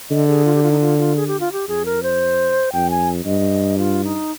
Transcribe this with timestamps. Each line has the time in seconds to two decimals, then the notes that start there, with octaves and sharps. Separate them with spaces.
0.10 D3 D#5
0.28 G#4
0.45 F4
0.55 G4
0.63 F4
0.72 D#4
0.81 F4
0.98 F4
1.16 G#4
1.27 G4
1.40 F4
1.52 G4
1.68 F2 G#4
1.85 A#4
2.03 C5
2.73 F2 G5
2.90 G#5
3.25 G2 D#5
3.78 F4
4.04 D#4